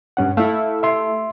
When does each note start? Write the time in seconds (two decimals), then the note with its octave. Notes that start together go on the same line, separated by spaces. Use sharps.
0.17 G2 C#4 F#5
0.37 A3 E4 F5
0.83 E5 C6